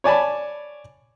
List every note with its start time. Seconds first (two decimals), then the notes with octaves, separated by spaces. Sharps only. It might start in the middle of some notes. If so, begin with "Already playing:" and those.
0.04 C#5 D5 G#5 A5 B5